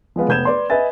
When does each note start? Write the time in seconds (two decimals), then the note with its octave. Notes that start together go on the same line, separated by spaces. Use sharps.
0.16 F3 G#3 B3 F5
0.28 F1 B3 G6 G#6 E7
0.45 B4 D5 C6
0.70 B4 D#5 E5 G#5 A6